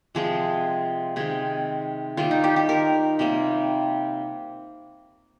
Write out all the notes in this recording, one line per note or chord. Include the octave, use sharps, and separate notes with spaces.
C3 F3 G#3 G#4
C3 D#3 G#3 G#4
D#3 G3 A#3 F4
D#4
G4
G4
A#4
C3 G3 A#3